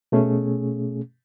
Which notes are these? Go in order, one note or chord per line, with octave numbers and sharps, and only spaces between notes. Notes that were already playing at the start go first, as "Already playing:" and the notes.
B2 A3 C#4 G#4